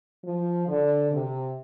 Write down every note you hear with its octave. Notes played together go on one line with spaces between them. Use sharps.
F3
D3
C3